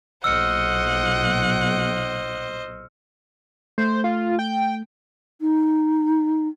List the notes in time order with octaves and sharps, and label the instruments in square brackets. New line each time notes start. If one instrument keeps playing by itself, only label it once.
[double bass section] B1 A#2 [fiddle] C5 D#5 [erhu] F#5 [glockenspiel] E6 F6 C#7
[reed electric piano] A3 [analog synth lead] C5
[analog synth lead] F4
G5
[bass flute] D#4